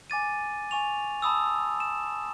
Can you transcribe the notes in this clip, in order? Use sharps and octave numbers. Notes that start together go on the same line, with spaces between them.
G#5 D6 A6 D#7
G#5 C#6 F7
A5 B5 D#6 E6
E7